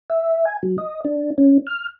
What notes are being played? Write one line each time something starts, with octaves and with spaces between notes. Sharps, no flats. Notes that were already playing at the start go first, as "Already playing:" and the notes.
E5
G#5
F#3
D#5
D4
C#4
F6